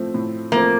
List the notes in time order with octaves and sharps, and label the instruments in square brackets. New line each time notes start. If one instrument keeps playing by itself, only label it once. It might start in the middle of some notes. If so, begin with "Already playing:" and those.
Already playing: [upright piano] A2 F3 A3 C4
A2
[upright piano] F3 A3 C4 [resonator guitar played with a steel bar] A#3